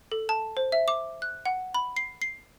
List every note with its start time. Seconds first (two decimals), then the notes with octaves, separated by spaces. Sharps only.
0.12 A4
0.29 A5
0.57 C5
0.72 E5
0.88 D6
1.22 F#6
1.46 F#5
1.74 B5
1.97 C7
2.22 C7